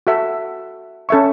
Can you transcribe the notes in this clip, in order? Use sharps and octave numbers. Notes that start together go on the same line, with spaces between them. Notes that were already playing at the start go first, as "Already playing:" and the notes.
F#4 A4 E5
C#4 A4 E5 C#6